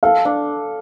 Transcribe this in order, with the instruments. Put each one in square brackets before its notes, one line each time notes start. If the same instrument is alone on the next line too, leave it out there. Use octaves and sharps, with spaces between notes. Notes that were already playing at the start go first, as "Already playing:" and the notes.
[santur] A4 [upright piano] F5
[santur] D4